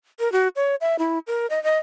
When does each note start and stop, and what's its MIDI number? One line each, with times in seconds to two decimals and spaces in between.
0.20 0.31 70
0.32 0.48 66
0.56 0.75 73
0.81 0.96 76
0.99 1.18 64
1.27 1.47 70
1.50 1.62 75
1.64 1.78 75